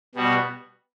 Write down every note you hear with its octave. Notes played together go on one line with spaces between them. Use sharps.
B2 G3 B3 F#4